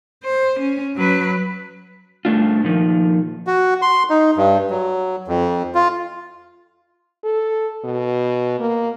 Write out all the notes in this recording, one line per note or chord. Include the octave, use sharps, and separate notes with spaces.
C5
C#4
F#3 B4
G2 A3 D4 F4
A#2 D#3 F3
F#4
C6
D#4
G2
F#3
F2
F4
A4
B2
A#3